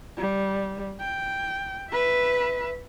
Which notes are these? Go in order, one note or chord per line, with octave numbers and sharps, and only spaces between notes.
G3
G5
B4 E5